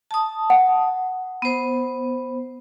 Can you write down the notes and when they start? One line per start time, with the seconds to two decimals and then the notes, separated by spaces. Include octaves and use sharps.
0.11 A5 D#6
0.50 F#5
1.42 B3 C5